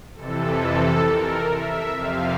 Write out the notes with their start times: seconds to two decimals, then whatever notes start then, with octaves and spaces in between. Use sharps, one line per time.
0.14 F2 C3 E3 A4
0.59 A4
1.04 A#4
1.48 E5
1.92 F2 C3 F3 F5